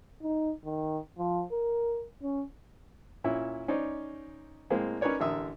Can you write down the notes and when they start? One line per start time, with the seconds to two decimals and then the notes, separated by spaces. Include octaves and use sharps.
0.22 D#4
0.65 D#3
1.18 F3
1.52 A#4
2.23 C#4
3.24 A#2 C#4 E4 E5
3.68 C#4 D#4 C5 D5
4.70 A2 G#3 A#3 C4
5.01 C#4 D#4 A#4 B4 C#5 D5
5.20 A1 D3 A#4 E5 D#6